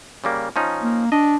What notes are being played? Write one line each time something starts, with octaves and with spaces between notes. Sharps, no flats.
C#3 G3 A#3
F3 C#4 D#4
A#3
D4 D#5